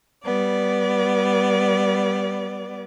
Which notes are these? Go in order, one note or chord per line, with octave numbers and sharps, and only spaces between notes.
G3 B3 D5